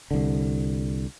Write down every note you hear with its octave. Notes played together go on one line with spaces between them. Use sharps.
C2 D3